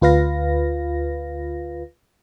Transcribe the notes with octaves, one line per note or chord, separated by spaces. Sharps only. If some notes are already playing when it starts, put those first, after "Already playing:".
D2 F4 B4 F5 A#6